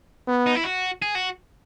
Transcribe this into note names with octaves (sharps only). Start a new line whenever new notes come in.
B3
D#4
E4
F#4
G#4
F#4